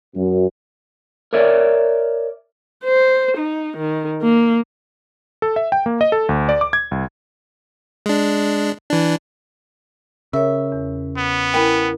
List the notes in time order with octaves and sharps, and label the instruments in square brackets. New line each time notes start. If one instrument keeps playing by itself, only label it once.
[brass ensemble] F#2
[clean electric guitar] A#4 C#5 D5 E5
[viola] C5
D#4
D#3
A#3
[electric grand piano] A4
E5
G5
A#3
D#5
A4
D2
D5
D6
G#6
C2
[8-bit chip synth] G#3 D4
E3 D4
[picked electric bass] C#3 [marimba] A#4 C#5 [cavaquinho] E5
[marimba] E2
[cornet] B3
[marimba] E4 A#4 [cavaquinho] G5 G#5 B5